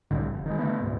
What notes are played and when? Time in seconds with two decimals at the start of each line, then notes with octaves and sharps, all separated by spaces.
0.11 C2 A2 D3 G3
0.34 F1
0.46 D#3 G#3
0.59 D3 D#3 A3 B3
0.80 D2 G#2 B2